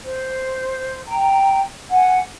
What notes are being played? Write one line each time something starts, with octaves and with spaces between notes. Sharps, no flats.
C5
G5 A#5
F#5 G#5